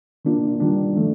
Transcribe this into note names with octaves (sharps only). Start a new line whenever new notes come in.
D#3 A#3 D4 F4
D#3 G3 D4
F3 A3